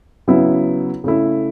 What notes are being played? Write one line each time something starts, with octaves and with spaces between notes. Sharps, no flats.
C#3 F#3 B3 E4
C#3 A3 E4